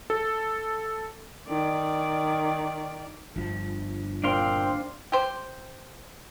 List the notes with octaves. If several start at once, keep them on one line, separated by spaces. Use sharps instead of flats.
A4
D#3 D5
G1 F3
A#2 C4 D4 C5 F5 C6
G4 C5